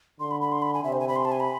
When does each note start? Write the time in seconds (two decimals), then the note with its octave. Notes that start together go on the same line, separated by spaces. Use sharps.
0.20 D3 C6
0.31 B5
0.41 B5
0.52 C6
0.62 B5
0.74 G#5
0.84 C3 E5
0.92 C5
1.00 G#5
1.08 B5
1.16 C6
1.25 A5
1.32 G#5
1.40 B5